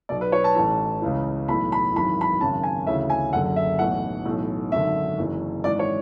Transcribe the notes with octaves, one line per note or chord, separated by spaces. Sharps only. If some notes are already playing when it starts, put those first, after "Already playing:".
B1 B2 D5
B4
C#5
A5
A1 A2 E3 A5
C#2 C#3 E3
B1 A2 E3 B5
B5
G#1 F#2 E3 B5
B5
G#1 F#2 C#3 A5
G#5
D2 C#3 E3 E5
G#5
F#1 F#2 D3 F#5
E5
B1 A2 E3 F#5
B1 A2 E3
G#1 F#2 D3 E5
F#1 F#2 E3
G#1 G#2 E3 D5
C#5